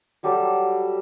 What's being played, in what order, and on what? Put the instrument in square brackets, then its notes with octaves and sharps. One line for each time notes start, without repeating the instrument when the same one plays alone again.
[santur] F#3 G3 G4 A4